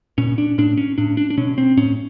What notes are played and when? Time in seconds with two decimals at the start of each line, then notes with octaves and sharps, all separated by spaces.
0.18 A#2 C#4
0.38 D4
0.58 A2 D4
0.77 C#4
0.98 A2 D4
1.17 D4
1.30 D4
1.37 B2 C#4
1.58 C4
1.77 A2 C#4